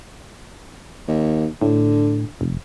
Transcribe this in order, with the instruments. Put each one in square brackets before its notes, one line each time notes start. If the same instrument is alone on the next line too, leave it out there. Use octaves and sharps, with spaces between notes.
[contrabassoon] D#2
[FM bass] A2 [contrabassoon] D3
[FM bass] F1